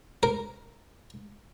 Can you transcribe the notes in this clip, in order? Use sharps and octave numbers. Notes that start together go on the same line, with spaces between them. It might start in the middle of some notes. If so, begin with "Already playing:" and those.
A#4